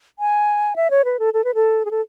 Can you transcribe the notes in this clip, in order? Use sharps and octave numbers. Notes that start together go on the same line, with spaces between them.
G#5
E5
C#5
B4
A4
A4
B4
A4
G#4
A4